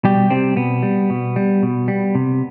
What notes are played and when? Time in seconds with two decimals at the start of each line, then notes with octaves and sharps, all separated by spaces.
0.04 B2 G3 G4
0.30 C3 G3 C4
0.56 B2 B3
0.83 G3
1.10 B2
1.36 G3
1.63 B2
1.88 G3
2.15 C3